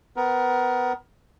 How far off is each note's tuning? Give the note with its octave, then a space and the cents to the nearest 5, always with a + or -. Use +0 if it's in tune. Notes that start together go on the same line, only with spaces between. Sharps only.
B3 +25 A#4 +25